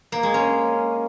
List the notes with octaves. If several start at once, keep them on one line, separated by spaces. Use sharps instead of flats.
A#3
G#3
C#4